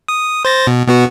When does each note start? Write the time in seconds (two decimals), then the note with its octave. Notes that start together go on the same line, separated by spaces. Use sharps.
0.08 D#6
0.45 C5 A6 A#6
0.67 B2
0.88 B2 B3 F#4